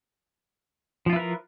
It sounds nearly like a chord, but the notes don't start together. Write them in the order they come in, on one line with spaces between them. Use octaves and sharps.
F3 F4 E4 B4 A#4